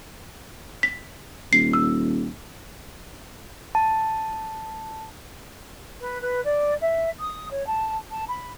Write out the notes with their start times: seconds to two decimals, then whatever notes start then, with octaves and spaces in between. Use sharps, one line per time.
0.83 B6
1.53 D#1 C7
1.73 E6
3.75 A5
6.01 B4
6.22 B4
6.44 D5
6.82 E5
7.19 D#6
7.51 C#5
7.67 A5
8.10 A5
8.28 B5